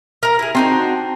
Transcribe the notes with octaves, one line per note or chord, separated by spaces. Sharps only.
A#4 A#5
E4 G#4
C4 D4 D#4 F#4